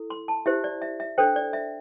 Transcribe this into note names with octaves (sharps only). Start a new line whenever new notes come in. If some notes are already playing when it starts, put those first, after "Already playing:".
Already playing: E4 A4
C6
A5
E4 G4 C5 E5
D5
E5
E5
D4 A4 C5 G5
D5
E5